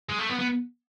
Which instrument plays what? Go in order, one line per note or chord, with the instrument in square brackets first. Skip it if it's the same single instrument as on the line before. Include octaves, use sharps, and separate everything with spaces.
[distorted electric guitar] G#3
A3
B3
B3